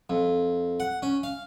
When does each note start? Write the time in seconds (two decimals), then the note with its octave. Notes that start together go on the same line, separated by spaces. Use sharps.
0.10 F2
0.80 F#5
1.02 C#4
1.23 F5